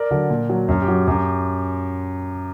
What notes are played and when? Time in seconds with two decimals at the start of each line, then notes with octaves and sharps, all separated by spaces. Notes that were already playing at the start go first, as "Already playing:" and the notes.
Already playing: A#4 D5
0.11 D3 F#3
0.30 A#2
0.49 F#3
0.68 F#2
0.82 G4
0.88 F#3
1.07 F#2 G4